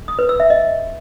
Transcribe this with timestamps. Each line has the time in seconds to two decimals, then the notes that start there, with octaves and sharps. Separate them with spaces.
0.08 D#6
0.19 B4
0.29 E6
0.40 E5
0.50 D#5